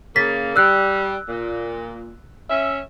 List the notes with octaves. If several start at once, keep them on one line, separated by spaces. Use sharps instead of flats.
C#3 A#3 A6 B6
G3 E6 F#6
A#2
C#4 E5